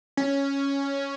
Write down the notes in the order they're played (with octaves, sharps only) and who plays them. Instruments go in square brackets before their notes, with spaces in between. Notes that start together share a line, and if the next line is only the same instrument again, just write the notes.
[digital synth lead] C#4